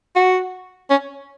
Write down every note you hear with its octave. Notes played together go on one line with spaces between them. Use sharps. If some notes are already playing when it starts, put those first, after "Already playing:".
F#4
C#4